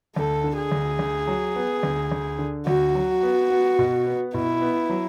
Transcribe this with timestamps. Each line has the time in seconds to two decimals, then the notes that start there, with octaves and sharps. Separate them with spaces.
0.16 D2 A4
0.44 D3
0.58 G#4
0.71 D2
0.99 D2
1.27 F#3
1.56 B3
1.83 D2
2.12 D2
2.39 D3
2.67 D2 F#4
2.95 F#3
3.23 B3
3.51 B3
3.79 B2
4.07 B3
4.34 B2 E4
4.62 B3
4.90 F#3